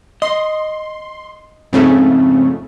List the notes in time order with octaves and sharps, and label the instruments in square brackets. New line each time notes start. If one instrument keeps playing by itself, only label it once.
[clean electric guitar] D#5 [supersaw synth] C6
[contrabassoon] F2 [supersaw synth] G#2 C#3 A3